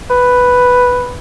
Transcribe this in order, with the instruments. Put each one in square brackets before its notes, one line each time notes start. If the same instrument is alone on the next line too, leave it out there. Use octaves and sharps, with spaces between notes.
[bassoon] B4